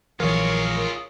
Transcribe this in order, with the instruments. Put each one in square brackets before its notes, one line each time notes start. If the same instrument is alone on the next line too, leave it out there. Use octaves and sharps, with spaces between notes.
[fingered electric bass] A#1 E3 F#3 [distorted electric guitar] F4 G#4 [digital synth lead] A#4 [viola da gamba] C#5